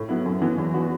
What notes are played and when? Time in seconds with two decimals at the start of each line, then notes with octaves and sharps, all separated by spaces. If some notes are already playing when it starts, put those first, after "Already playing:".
Already playing: A2
0.09 F#3 B3 E4
0.26 F#2
0.42 E3 B3
0.58 E2
0.74 E3 B3 F#4